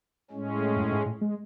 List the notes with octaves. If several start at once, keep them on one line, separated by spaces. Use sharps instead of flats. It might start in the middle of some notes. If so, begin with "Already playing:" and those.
A2 G#3 C#4
F#2
G#2
A2
G#3